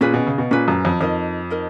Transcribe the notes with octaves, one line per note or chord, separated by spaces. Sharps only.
A#2 C#4 G#4 B4
B2
C#3
B2
A#2 C#4 G#4 B4
F#2
F2
F2 D#4 A#4 D#5
D#4 A#4 D#5